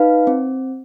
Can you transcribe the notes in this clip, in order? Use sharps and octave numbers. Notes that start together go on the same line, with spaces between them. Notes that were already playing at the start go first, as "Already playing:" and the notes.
Already playing: D#4 B4 F5
C4